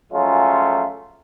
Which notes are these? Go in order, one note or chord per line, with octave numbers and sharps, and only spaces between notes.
F3 F#3 G#3 A3 C#4 F4